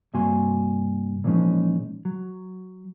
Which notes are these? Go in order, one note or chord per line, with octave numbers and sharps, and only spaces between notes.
G2 C3 A#3 F#4 G#5 C6
A#2 E3 F3 G#3 C#4 D#4
F#3